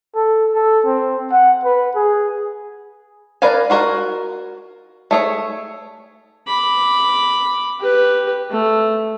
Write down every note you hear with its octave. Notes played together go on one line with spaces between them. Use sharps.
A4
A4
C4
F#5
B4
G#4
A#4 B4 D5 F5 G#5
F4 F#4 A#4 F5 G#5
A3 G#4 C#5
B5 D6
G4 B4
A3